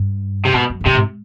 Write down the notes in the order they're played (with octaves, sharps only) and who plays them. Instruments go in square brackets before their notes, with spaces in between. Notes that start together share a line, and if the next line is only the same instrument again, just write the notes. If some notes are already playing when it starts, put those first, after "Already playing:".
Already playing: [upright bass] G2
[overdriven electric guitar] C3
[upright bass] G#2 [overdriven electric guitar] B2
[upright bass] F#2
G2
[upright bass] F#2 [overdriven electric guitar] C3
[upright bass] G#2